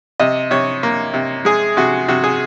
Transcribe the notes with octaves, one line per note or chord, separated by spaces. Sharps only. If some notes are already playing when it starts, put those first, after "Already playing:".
C3 D#5
C3 C#5
A#3
C3
G#3 G#4
C3 F#4
C3 F#4
G#4